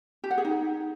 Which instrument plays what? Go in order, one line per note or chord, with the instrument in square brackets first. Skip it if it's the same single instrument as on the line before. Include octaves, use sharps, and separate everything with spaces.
[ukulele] G4
F#5
G#4
D#4